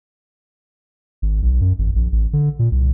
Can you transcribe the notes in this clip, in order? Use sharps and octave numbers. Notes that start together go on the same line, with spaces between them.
G#1
B1
F#2
G#1
A#1
A1
D3
A#2
C2